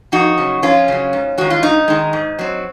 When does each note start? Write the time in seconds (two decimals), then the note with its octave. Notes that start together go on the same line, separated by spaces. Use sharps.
0.12 F2 D#4 F#4
0.38 C#3 F#3
0.62 F2 C#4 F4
0.88 C#3 F#3
1.13 G#2
1.38 D#3 G#3 F#4
1.50 F4
1.62 G#2 D#4
1.88 D#3 G#3
2.13 G#2
2.39 F#3 C4